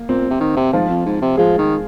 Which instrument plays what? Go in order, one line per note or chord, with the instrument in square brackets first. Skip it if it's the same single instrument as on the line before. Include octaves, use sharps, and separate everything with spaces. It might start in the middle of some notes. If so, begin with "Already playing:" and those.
Already playing: [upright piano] A#3
[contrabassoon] A#2 [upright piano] C4
[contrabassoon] C3
D#3
C3
[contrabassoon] G#2 [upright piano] F3 F4
[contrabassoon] F2
G#2
C3
[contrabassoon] F3 [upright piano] G#3 G#4
[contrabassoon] D#3